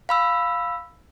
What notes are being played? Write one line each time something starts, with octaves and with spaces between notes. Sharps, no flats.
F5 B5 E6